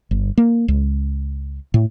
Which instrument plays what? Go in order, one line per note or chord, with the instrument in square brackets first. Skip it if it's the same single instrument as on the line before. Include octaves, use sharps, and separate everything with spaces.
[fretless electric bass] G1
A#3
C#2
A2